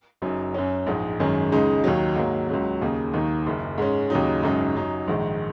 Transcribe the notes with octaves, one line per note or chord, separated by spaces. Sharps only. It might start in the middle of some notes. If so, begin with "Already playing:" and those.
F#1 F#2 F#3 D#4
F#2 F#3 C#4
A#1 G#2 G#3 D#4
G#1 F#2 D#3 G#3 C#4
C#2 C#3 G#3 D#4
D#2 D#3 F#3
G#2 F#3 A#3
C#2 C#3 F#3
D#2 C#3 A#3 D#4
D#2 D#3 A#3 D#4
F#1 F#2 C#3
G#2 G#3 C#4
D#2 C#3 F#3 D#4
G#1 F#2 C#3 F#3 D#4
F#2 F#3 D#4
A#1 G#2 D#3 G#3